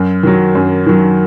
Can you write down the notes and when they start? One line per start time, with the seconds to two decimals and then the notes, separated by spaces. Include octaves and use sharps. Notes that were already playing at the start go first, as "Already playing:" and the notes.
Already playing: F#2
0.23 D#3 F#3
0.55 F#2
0.86 D#3 F#3